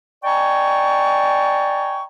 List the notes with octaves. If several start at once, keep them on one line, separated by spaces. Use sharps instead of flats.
D5 D#5 G5 G#5 A#5 C#6